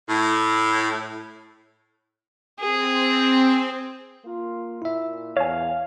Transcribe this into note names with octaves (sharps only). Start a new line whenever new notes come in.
A2
C4 G#4
A#3 F4
A#2 E4 E5
E2 C#5 F5 G#5